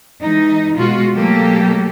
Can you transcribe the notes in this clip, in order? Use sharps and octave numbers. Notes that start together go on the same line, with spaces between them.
E3 G#3 D#4
B2 G#3 F4 F#4
B2 F#3 A3 A#3 G4 A4